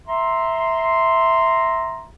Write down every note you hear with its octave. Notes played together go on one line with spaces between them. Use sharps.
E5 A#5 C6